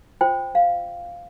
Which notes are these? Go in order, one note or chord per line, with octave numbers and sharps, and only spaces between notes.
F4 C5 G5
F5